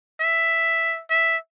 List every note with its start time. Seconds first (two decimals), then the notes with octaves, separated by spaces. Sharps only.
0.20 E5
1.10 E5